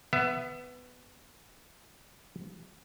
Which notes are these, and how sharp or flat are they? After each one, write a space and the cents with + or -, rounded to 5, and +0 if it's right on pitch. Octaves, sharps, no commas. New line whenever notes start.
B3 +10 E5 +30